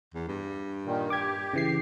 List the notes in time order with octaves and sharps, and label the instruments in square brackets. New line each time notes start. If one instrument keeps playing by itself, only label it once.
[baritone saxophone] E2
G2
[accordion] A#2 D#3
[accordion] G4 [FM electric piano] D6 G#6
[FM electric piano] C#3 E3 C7